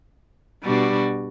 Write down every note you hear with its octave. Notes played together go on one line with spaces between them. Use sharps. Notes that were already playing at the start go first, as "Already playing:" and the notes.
B2 G3 D4 F#4